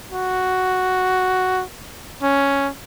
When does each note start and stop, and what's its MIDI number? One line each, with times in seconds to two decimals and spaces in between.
0.12 1.63 66
2.23 2.69 61